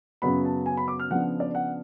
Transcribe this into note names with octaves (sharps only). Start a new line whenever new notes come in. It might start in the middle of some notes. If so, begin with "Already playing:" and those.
F#2 C#3 F#3 B3 B5
A5
G#5
B5
D6
F6
C#3 F3 B3 D4 F#5
D5
F#5